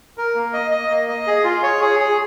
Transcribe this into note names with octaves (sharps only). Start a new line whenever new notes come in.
A#4
A#3
D#5
D#5
A#3
D#5
G#4
F4
C#5
G#4
G#4